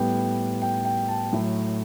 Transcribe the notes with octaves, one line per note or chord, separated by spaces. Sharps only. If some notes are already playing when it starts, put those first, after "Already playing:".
Already playing: A2 G3 B3 G5
G5
G5
A5
A2 F#3 A3